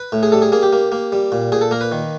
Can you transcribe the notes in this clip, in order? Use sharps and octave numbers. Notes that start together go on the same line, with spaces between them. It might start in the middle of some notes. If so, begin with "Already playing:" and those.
Already playing: B4
A2
G#4
G3 A4
G#4
A#3 G#4
G4
A#3
A#3
G3
A#2
A#2 G#4
A4
A#3 A#4
B4
D#3